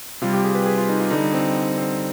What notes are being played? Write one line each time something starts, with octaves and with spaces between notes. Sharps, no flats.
C3 G3 F4
G4
G#4
B4
G#4
F4
D#4
F4
D3 G3 D#4
C4
C4